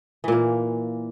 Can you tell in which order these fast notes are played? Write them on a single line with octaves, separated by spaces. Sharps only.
E3 A#2 A#3